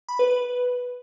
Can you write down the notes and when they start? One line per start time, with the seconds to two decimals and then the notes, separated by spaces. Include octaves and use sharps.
0.09 B5
0.19 B4
0.30 B4